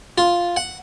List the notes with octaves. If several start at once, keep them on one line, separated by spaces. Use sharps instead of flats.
F4
F#5